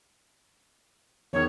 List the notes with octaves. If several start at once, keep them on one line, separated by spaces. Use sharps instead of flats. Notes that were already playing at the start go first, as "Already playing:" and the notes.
E2 D#3 C#5